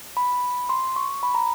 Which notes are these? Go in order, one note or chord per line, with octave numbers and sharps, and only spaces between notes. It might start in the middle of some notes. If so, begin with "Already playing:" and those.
B5
C6
C#6
B5
A#5